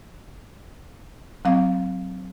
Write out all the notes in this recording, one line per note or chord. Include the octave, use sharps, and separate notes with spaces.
F#3 C4 F5